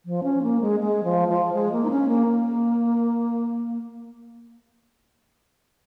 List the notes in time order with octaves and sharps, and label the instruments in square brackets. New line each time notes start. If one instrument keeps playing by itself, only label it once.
[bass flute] F3
C#4
A#3
G#3
G#3
F3
F3
G#3
A#3
D#4
C#4
A#3
A#3